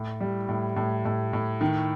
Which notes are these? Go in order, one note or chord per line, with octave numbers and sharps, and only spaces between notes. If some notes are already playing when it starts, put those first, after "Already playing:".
Already playing: A2
G3
A2
A2
A2
A2
D#3